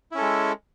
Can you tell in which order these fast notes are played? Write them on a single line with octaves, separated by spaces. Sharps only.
E4 C#4 A4 G#3